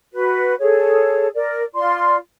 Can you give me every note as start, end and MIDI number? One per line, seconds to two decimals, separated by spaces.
0.12 0.53 66
0.12 0.53 71
0.60 1.27 68
0.60 1.27 69
0.60 1.27 73
1.34 1.62 70
1.34 1.62 74
1.74 2.16 65
1.74 2.16 74
1.74 2.16 84